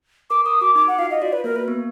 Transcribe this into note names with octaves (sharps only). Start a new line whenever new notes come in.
A#4 D6
A#4 D#6
F#4 D6
D#4 D6
F#5
F4 F5
D#5
F#4 D5
B4
A#3 A#4
B4
B3